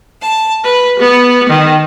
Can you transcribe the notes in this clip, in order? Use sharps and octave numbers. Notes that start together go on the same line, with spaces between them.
A5
B4
B3
D#3